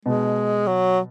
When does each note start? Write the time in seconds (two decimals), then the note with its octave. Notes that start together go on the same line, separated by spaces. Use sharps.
0.05 B2 G#3
0.67 F#3